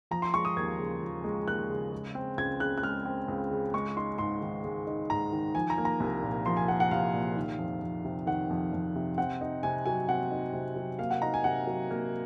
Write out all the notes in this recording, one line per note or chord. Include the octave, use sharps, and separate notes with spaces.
F3 A#5
C6
G#3 C#6
D#6
D#2 G#6
C#3
F3
G#3
D#2 F#6
C#3
G#3
C4
C#2 G#6
C#3 F#6
F#6
G#3 F6
C4
C#2
C#3
G#3 C#6
D#4 C6
G#2 C6
D#3
G#3
D#4
G#2 A#5
D#3
F3 G#5
A#5
A#3
A#5
C2
A#2
F3 C6
G#5
A#3 F#5
F#5
C2 F5
A#2
D#3
F2
F2
C3
D#3 F#5
F2
F2
C3
C4 F#5
D#4
C3 G#5
F#3 G#5
C4 F#5
D#4
C3
F#3
A#3 F5
F#5
D#4 A#5
G#5
C3 F#5
F#3
A#3